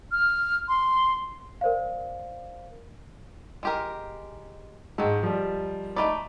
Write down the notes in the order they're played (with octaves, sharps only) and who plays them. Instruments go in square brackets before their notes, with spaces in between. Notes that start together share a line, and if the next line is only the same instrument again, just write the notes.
[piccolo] F6
C6
[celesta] A#4 C5 D5 F5
[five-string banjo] G#3 G4 A#4
[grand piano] G#2 [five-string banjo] D#3 A4
[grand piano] F3 G3
[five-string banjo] A3 D#4 D5 [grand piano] B5 D6